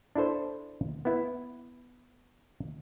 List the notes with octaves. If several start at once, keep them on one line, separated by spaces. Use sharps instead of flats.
D4 E4 A4 C5
B3 E4